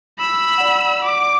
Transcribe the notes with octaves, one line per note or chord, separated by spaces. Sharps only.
B5 E6
D5 F#5
D6